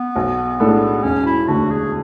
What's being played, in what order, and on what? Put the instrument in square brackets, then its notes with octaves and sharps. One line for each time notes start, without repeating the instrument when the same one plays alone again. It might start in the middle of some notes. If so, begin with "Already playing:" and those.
Already playing: [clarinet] B3
[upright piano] B1
A2 G#3 D4 A4
[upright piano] E1 [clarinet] C#4
[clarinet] E4
[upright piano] D2 D3 [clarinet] F#4
[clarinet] G#4